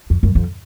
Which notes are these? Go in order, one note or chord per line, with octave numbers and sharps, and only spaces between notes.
F2
F#2
F2